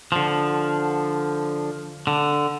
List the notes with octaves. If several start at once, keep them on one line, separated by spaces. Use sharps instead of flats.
D3 F3
D3